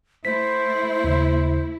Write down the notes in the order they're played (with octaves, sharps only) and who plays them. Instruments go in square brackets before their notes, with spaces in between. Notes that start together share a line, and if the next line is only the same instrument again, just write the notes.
[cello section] A3 E4 [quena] C5 [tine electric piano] B6
[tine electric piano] D#2 C#3